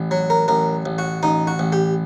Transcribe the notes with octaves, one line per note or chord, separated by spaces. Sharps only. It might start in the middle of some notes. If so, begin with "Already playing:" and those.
Already playing: A1
F#3
A#4
A1 A#4
A1
F#4
A1 D#4
F#4
A1
G4